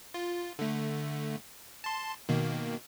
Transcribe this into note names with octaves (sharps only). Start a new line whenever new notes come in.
F4
D3 A3
A5 C6
B2 D#3 A#3